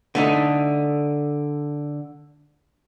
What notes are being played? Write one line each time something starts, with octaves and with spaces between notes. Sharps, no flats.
D3 A3 D#4